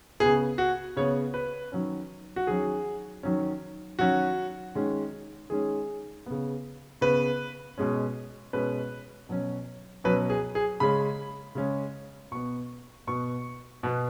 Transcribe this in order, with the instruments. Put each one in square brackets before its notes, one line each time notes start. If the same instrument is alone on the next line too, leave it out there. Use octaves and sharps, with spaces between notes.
[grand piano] C#3 B3 G#4
F#4
C#3 B3 C#5
B4
D#3 F#3 C#4
F#4
D#3 F#3 C#4 G#4
D#3 F#3 C#4
D#3 F#3 C#4 F#4
D#3 G#3 C#4
D#3 G#3 C#4 G#4
C#3 B3
C#3 B3 B4
B2 G#3 C#4
B2 G#3 C#4 B4
B2 F#3 C#4
B2 F#3 C#4 B4
G#4
G#4
C#3 G#3 C#4 B5
C#3 G#3 C#4
B2 B3 C#6
B2 B3 C#6
B2 B3